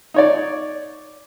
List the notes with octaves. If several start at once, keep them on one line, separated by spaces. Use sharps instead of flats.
D#4 C#5 D5